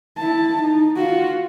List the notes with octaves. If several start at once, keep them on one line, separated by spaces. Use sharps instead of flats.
E4 A5
D#4
F4 F#4